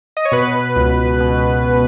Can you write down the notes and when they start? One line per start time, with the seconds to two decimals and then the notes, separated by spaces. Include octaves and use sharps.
0.17 D#5
0.25 C#5
0.32 B2 B4
0.76 C#2
1.20 B2
1.65 B2